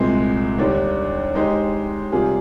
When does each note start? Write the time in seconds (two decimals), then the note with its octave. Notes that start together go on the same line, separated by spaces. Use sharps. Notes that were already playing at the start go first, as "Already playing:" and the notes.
Already playing: C2 A#2 G#3 C4
0.58 D#2 D3 G3 A#3 D4
1.35 D#3 G#3 D#4 G4 C5
2.12 C3 G3 A#3 F4 G#4